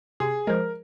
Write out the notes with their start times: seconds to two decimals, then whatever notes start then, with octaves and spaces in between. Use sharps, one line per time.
0.20 C3 G#4
0.47 F3 G#3 A#4